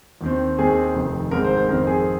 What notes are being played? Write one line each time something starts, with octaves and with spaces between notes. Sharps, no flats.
D#2 D#3 C4
D#2 D#3 C4 G#4
F1 F2 D#3
G#1 G#2 G#3 C4 A#4
C5
C5
F2 D#3 C4 A#4
G#4